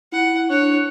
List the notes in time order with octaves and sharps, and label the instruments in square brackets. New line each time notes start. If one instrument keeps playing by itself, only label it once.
[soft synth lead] E4 [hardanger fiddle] F#5
[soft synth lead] D4 [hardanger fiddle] C#5 [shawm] F#5